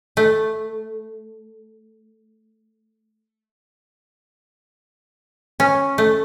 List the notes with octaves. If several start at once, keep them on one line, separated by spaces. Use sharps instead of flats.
A3
C#4
A3